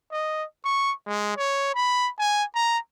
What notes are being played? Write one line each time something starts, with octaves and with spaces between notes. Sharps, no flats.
D#5
C#6
G#3
C#5
B5
G#5
A#5